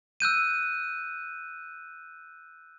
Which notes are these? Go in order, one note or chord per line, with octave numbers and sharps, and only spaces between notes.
E6 F#6 G6 D#7